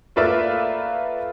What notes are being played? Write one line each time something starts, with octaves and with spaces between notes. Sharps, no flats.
A3 A#3 F4 B4 D5 E5